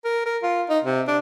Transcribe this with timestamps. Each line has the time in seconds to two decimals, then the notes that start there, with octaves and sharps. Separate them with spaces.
0.05 A#4
0.26 A#4
0.43 F4
0.70 D#4
0.84 C3
1.08 D4